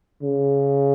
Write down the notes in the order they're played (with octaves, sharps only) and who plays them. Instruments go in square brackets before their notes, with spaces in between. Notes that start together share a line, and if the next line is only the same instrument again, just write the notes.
[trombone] C#3